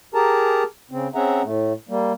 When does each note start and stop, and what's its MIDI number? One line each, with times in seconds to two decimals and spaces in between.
0.14 0.63 67
0.14 0.63 68
0.14 0.63 70
0.14 0.63 81
0.14 0.63 82
0.91 1.08 49
0.91 1.08 60
1.15 1.42 60
1.15 1.42 61
1.15 1.42 68
1.15 1.42 76
1.15 1.42 78
1.15 1.42 82
1.44 1.73 45
1.44 1.73 57
1.89 2.13 55
1.89 2.13 58